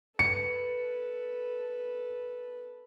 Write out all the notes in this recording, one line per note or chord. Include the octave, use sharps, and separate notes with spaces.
A4 B4 C#7